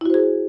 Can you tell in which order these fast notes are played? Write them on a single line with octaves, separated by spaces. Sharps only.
E4 F#4 C5 G#4